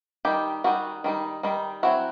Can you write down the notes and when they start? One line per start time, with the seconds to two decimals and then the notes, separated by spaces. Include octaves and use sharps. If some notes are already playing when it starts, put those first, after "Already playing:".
0.25 D#3 G3 D#4 G4
0.64 D#3 G3 D#4 F#4
1.04 D#3 G3 D#4
1.43 D#3 G3 D#4
1.83 F#3 C4 E4 F#4